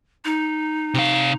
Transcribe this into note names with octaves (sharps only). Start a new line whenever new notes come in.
D#4
C3 F5